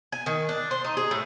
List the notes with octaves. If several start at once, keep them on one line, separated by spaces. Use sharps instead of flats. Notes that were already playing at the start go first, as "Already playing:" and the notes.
G#5
D#3
D4
C5
D#4
G#4
A2